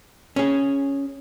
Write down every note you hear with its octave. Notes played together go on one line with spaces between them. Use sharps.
C#4 G#4